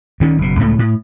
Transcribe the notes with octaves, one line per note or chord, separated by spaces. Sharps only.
D2 D#3 C#4
F#1 B2
C#2 A2 A3
A2